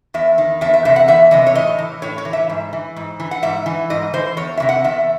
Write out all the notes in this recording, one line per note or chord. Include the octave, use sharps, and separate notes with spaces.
E2 E5
D#3
E2 E5
E5
C3 E3 E5
F#5
E2 E5
C3 E3 D#5
C#5
A2 D#5
E3
A2 C#5
C#5
E3
E5
G#2
E3
G#2
E3
F#5
G#2 E5
E3
G#2 D#5
E3 C5
E2 C#5
C3 E3 E5
F#5
E2 E5